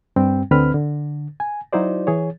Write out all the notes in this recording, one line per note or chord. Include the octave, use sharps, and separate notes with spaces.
G2 G3 C4 G5
D2 D3 C4 B4 B5 F6
D3
G#5
F#3 D#4 E4 F#4 C5 D5
E3 G#4 C#5